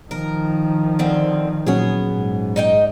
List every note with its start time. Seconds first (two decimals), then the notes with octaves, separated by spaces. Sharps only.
0.11 D#3 F3 A#4
0.99 D3 C4
1.67 A#2 F#3 B3 C#4 G#4
2.14 G#2
2.56 D#4 D#5 G5